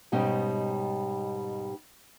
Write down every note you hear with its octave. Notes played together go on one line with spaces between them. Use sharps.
G#2 B2 G3 C#4 D#4